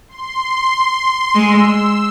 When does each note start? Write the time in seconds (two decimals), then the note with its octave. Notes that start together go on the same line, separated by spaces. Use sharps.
0.09 C6
1.35 G#3 E6
1.67 E6